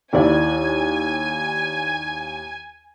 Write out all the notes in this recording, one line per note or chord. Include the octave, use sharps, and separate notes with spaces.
D#2 E4 D5 G#5